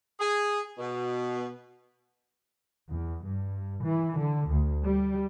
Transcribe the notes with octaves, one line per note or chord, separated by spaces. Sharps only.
G#4
B2
E2
G2
E3
D3
D2
G3